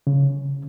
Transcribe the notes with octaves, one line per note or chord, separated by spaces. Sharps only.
C#3